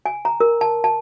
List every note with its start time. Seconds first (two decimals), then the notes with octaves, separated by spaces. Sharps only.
0.06 G#5
0.25 A#5
0.40 A#4
0.61 A5
0.84 A5